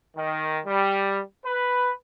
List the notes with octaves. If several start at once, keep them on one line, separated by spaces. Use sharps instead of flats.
D#3
G3
B4